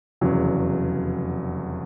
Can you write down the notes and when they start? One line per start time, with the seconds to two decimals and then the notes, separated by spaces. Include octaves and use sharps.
0.21 F1 E2 C#3 F#3